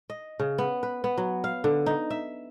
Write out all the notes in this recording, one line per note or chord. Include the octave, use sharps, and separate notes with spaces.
D#5
C#3
B3
B4
B3
F#3
F5
D3
D#4
E5